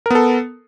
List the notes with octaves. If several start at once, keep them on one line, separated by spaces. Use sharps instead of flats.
B3 A4 A#4